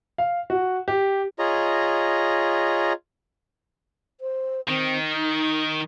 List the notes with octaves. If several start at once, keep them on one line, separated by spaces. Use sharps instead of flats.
F5
F#4
G4
F4 G#4 C#5 D#5 A#5
C5
D#3 C4
D#4